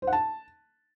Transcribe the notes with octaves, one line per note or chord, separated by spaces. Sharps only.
C5
F#5
A5